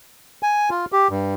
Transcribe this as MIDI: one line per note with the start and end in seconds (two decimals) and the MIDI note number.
0.43 0.70 80
0.70 0.85 65
0.92 1.08 67
1.10 1.34 43